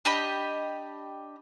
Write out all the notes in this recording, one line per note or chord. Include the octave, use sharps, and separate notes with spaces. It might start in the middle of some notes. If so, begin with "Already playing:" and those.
D4 G4 D#5 B5